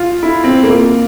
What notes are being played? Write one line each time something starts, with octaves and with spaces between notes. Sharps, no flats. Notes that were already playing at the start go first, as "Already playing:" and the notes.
Already playing: F4
E4
C4
A#3